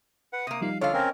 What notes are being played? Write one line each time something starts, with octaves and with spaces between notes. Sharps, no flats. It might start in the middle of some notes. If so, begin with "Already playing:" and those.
B4 F#5
C3 A#3 D#6
F3 G3 D#4 F5
D3 F4 A4 C#5 D#5 F5 F6
C4 C#4 A#4